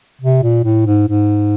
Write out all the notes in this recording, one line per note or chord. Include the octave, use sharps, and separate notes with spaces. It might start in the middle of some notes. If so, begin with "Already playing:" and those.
C3
A#2
A2
G#2
G#2